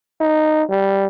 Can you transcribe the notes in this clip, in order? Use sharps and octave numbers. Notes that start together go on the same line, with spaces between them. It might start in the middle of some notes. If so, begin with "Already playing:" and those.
D#4
G3